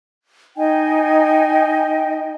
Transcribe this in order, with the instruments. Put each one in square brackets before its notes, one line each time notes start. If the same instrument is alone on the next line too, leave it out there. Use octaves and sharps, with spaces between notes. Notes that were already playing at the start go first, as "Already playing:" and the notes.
[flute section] D#4 D#5 G5 G#5